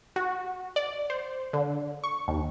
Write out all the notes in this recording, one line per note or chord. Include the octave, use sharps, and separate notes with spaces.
F#4
D5
C5
D3
C#6
D#2